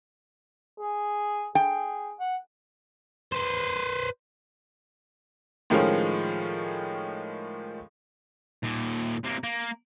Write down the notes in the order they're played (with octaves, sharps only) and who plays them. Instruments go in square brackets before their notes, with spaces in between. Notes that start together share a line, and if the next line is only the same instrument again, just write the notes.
[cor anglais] G#4
[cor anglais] G#4 [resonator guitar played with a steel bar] G5
[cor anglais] F#5
[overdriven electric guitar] B4 C5
[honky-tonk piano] A2 D#3 F3 G#3 C#4 F4
[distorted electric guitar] D#2 A#2
C3 A#3
A#3